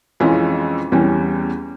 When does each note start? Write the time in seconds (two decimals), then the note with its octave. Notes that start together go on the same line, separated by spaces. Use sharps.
0.20 F2 E3 G#3 C#4 F4
0.92 E2 E3 G3 C#4